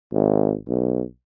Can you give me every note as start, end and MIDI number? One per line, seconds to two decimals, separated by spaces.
0.13 0.54 32
0.68 1.02 35